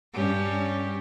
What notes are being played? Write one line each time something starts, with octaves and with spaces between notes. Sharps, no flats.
G2 C#4 G4